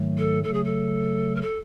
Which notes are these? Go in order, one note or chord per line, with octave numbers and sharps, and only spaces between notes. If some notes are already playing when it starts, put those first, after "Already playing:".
Already playing: G#2 D#3 F#3 A3
A4
C#3 F#3 A3 A4
G#4
A4
A#4
A4